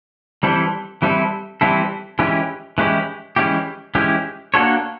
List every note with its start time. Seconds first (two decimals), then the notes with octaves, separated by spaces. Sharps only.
0.43 E3 G3 C4 E4 A4
1.02 E3 G3 C4 E4 A4
1.61 E3 G3 C4 E4 A4
2.19 E3 G#3 C#4 E4 G4
2.78 E3 G#3 C#4 E4 G4
3.36 E3 G#3 C#4 E4 G4
3.95 E3 G#3 C#4 E4 G4
4.54 A#3 D4 F#4 A4 C#5